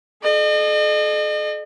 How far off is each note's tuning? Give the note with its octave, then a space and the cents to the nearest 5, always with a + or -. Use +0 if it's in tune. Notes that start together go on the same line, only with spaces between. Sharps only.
A4 -40 D#5 -40